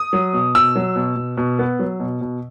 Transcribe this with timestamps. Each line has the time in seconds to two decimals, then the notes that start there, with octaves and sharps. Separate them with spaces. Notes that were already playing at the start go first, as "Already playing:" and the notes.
Already playing: D#6
0.13 F#3
0.33 B2
0.55 B2 E6
0.75 F#3
0.96 B2
1.16 B2
1.37 B2
1.59 B3
1.79 F#3
2.00 B2
2.21 B2